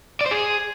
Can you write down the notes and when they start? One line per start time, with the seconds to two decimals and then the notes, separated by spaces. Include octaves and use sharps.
0.21 D5
0.26 C5
0.31 G#4